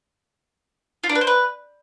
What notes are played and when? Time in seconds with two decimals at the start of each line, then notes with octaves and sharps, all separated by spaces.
1.04 F4
1.09 D4
1.15 B4
1.21 C5
1.27 B4